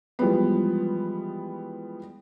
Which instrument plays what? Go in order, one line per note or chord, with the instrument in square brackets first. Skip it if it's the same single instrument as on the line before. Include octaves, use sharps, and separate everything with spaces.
[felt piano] E3 F3 G3 G#3 B3